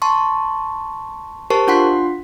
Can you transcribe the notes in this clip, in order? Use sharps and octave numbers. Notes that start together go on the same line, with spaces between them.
A5 C6 C#6
G4 A#4 C5 A5 C#6
D4 F4 F#5 C6 B6